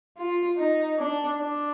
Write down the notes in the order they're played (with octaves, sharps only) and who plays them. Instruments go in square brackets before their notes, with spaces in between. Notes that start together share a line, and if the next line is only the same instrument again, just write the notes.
[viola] F4
D#4
D4
D4